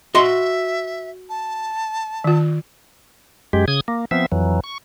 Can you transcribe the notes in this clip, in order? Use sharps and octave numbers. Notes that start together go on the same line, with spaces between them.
F#4 D#5 E5 C6
A5
D#3 F4
F#2 G#3 G4
C#3 D#6 G#6
A#3
F3 B3 C4 E5
F2 E3 F#3
C#6